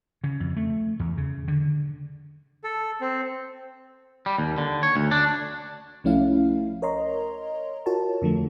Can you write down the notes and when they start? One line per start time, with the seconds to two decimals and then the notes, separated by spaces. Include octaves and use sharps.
0.24 C#3
0.40 F2
0.56 A3
0.99 E2
1.17 C#3
1.48 D3
2.64 A4
3.01 C4
4.26 G3
4.38 D#2
4.58 D3
4.83 C#5
4.95 D2
5.11 D4
6.04 C2 F3 A3 C#4 E4 F5
6.82 A#4 C#5 D#5 A#5 C6
7.86 F4 F#4 A#4 C#5 A5
8.22 F2 D3 F3 A3